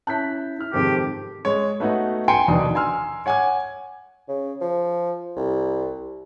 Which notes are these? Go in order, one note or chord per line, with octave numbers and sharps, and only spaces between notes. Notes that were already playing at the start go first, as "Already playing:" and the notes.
C#4 E4 A5 F#6 G6 B6
E4 F6
F2 G#2 C3 D#3 C4 G4 A4
G#3 C#5
A3 B3 D#4 F#4 F#5
G5 G#5 A#5 C6 C#7 D7
F1 D#2 B2 D4 D#6
G#5 A#5 C6 E6 F6
C#5 F#5 G#5 D6 G#6
C#3
F3
C2